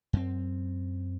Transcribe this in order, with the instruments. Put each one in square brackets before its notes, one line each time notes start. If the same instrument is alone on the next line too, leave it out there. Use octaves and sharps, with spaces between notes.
[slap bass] F#2 C4